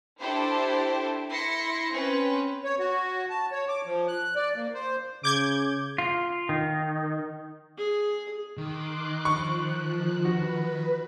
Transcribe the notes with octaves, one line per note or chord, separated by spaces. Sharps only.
D4 E4 G4 A4 C5
E4 C6 A#6 C#7
C4 C#4 B4
C#5
F#4
A5
C#5
D6
F3
F#6
D5
A#3
C5
C#3 D6 G6 G#6
F4
D#3
G#4
D#3 C6 D6 F#6
F3 C#6 F#6
F#4 B4